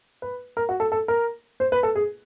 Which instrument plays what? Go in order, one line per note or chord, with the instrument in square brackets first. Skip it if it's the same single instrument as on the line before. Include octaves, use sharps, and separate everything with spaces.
[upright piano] B4
A#4
F#4
A4
A4
A#4
C5
B4
A4
G#4